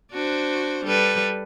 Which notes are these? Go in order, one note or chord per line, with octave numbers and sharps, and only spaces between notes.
D4 F#4 C5
G3 A4 B4